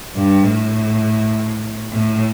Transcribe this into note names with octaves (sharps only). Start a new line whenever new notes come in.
G2
A2
A2